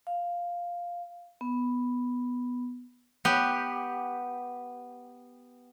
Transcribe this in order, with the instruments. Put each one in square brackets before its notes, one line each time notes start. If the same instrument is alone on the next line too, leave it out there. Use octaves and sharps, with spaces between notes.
[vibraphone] F5
B3
[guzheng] B3 G4